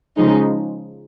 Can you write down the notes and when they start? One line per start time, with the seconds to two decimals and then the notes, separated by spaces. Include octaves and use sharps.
0.16 C#3 F3 G#3 D#4